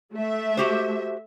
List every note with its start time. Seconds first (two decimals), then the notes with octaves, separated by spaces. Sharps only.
0.15 A3 E5
0.57 F#4 G4 C5